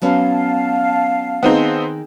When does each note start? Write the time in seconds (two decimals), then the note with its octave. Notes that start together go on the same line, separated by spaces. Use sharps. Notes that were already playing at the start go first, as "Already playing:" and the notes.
0.02 F#3 B3 C#4 F5 A5
1.43 D#3 B3 C4 D#4 G#4